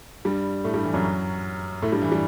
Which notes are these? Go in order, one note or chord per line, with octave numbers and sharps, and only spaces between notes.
G2 G3
A2 A3
G2 G3
E3
F#2 F#3
A2 A3
G2 G3
E3
G3